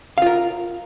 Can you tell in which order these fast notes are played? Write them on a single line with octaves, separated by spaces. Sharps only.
F5 F4 A#4